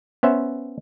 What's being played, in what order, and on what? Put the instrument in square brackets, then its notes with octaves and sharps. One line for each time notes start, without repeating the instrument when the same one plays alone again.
[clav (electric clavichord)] B3 C#4 C5 E5